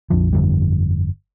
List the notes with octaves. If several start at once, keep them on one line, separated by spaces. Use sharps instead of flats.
A#1 F2 D3 F3
G1 F2 D3 G3